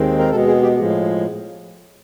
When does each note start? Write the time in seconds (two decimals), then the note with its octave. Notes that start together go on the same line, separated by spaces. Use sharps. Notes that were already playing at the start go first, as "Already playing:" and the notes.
Already playing: D#2 D#3 G#3 C4
0.19 A#4
0.31 B2 G#3 B3 A4
0.47 G#4
0.62 G4
0.78 A2 F3 G#3